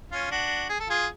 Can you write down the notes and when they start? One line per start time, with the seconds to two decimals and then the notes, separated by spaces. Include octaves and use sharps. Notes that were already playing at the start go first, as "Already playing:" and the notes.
0.12 C#4 F4
0.31 D4 F#4
0.69 G#4
0.80 A4
0.90 F4 G#4